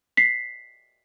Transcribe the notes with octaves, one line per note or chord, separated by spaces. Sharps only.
B6 C7